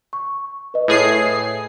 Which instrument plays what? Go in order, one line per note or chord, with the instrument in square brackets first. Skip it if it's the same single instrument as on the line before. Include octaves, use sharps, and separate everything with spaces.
[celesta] C#6
B4 D#5
[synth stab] A2 G#4 C7